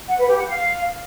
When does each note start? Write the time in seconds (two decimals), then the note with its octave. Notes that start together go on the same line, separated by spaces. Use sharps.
0.08 F#5
0.18 B4
0.28 G4
0.37 F#5
0.47 F5